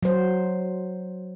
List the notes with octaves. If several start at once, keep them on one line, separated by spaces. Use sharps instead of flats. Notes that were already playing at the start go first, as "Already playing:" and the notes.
F#3 C5